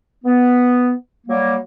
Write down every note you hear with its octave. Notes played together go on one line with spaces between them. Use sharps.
B3
F#3 G3 A#3